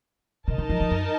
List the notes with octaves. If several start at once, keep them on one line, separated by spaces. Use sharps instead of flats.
C3 D#4 A#4 D#5 A5
C#3
F3
F3
F#2